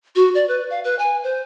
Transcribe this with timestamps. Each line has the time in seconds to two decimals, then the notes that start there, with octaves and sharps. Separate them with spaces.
0.16 F#4
0.35 D5
0.48 B4
0.70 F5
0.84 B4
0.99 G#5
1.24 C5